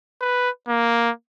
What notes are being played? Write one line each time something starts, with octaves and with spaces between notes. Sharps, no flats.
B4
A#3